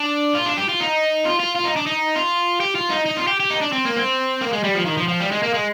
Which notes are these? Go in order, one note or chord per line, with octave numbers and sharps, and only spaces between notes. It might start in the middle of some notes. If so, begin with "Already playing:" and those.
Already playing: D4
F4
D4
G4
F4
D#4
F4
F4
F4
D#4
D4
D#4
F4
G4
F4
D#4
D#4
F4
G4
G4
D#4
D4
C4
A#3
C4
A#3
G#3
G3
F3
D#3
F3
F3
G3
G#3
A#3
G#3